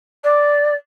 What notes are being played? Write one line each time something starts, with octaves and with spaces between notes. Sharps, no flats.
D5